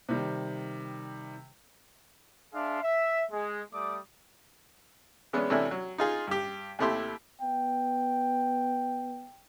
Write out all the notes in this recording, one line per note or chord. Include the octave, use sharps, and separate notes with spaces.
C3 D#3 G3
D4 G#4 E5 F5 C6
E5
G#3
G3 A3 D5 D6 D#6
E3 G#3 B3 C#4 D4
C3 E3 A3 C#4 D4 E4
F#3
D#4 F4 G#4
G2 G4
D#2 C3 A3 E4 G4 C6
B3 G5